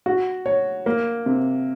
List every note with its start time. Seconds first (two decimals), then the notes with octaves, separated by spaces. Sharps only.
0.06 F#4
0.46 C#5
0.86 A#3
1.26 C3